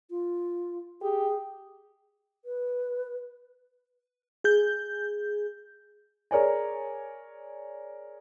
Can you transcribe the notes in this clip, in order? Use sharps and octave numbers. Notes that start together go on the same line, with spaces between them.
F4
G4 G#4
B4
G#4 G6
G#4 A#4 C#5 D5 G#5